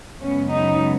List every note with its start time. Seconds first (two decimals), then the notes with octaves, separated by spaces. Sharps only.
0.21 F#2 C#3 G#3 B3 C#4
0.51 D#4